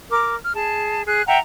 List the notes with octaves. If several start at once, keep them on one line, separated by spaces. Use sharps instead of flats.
A#4 D6
F6
G#4 A5
G#4 F#6
E5 F#5 G5 A#5